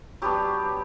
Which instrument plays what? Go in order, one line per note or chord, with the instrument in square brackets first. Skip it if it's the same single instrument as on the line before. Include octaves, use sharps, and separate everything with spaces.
[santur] F#3 B3 D4 G4